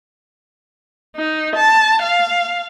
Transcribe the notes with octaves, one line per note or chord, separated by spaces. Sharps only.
D#4
A5
F5